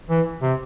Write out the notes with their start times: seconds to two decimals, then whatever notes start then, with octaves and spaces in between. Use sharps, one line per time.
0.10 E3
0.42 C3